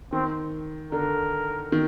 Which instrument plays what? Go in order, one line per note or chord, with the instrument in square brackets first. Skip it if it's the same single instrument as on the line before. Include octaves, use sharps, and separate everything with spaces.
[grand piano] D#3 [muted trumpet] C4
[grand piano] D3 [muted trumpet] A#4
[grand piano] D#3